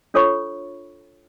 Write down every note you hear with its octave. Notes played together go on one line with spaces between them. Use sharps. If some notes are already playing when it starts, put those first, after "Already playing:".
D4 F4 A4 C#5 B5 C#6